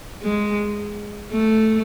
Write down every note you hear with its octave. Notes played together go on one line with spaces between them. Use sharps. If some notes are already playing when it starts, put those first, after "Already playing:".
G#3
A3